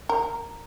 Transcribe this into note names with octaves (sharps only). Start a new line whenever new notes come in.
A#4